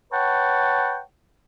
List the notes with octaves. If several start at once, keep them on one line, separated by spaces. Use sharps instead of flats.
B4 C#5 F#5 G5 A5